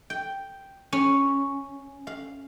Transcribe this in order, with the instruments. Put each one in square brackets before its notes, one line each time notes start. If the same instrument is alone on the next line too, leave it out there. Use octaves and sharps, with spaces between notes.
[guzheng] G5
C#4
F5